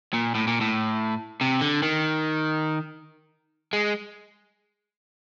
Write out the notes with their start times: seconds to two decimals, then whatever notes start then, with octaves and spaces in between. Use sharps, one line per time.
0.13 A#2
0.35 A2
0.47 A#2
0.61 A2
1.41 C3
1.61 D3
1.83 D#3
3.73 G#3